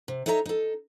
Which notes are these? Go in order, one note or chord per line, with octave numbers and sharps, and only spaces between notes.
C3
D#4 A4 C#5 E5 F#5 A#5
D#4 A4